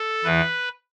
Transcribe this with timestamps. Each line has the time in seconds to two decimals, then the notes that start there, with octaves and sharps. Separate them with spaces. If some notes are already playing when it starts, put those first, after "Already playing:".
Already playing: A4
0.24 E2 E3 B4